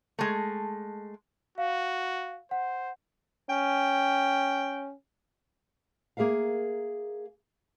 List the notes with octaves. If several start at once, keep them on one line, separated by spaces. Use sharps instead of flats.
G#3 A3
F#4 F5
C5 F#5
C#4 G5
A#3 G#4 A#4 E5 F5